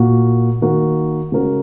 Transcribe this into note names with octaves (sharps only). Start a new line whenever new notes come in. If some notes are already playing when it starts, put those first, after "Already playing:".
Already playing: A#2 A#3 F#4
D#3 A#3 F#4 A#4
C#3 G#3 F#4 A#4